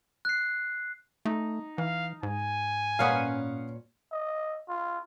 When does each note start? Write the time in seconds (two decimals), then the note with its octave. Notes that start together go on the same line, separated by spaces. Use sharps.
0.25 F#6 C7
1.25 A3 D#4
1.78 E3 F5
2.23 G#2 G#5
2.99 A#2 C#4 B4 F5 F#5 D#6
4.12 D#5
4.69 F4